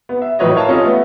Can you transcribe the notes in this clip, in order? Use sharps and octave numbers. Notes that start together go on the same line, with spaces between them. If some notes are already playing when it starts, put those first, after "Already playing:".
B3
E5
A2 E3 F#3 B4 C#5 D#5
A#4 C#5 F5 A5
C#4 F4 A4 D#5
A3 B3